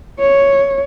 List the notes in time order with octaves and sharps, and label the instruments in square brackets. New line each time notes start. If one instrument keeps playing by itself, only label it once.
[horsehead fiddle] C#5